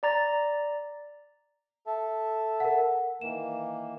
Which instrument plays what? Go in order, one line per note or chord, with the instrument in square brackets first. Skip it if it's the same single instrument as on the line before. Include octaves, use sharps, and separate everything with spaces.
[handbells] D5 A#5 A6
[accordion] A4 E5 A5
[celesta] A#4 F#5
[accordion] D#3 E3 A#3 [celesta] E7